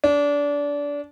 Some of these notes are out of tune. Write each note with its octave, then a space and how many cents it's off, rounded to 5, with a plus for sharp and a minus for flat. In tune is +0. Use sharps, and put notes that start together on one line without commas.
D4 -25